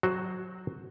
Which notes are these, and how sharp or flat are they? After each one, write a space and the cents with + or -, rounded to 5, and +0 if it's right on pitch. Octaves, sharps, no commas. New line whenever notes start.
F#3 +0 F#4 +0 C5 +15